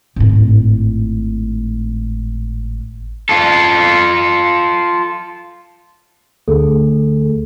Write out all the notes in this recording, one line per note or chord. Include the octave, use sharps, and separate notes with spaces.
G#1 A2
F4 A4
D2 D3 A3 G#4 A4